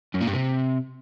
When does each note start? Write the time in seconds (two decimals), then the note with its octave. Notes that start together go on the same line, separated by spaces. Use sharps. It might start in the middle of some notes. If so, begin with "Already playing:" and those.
0.14 F#2
0.21 A#2
0.27 G2
0.34 C3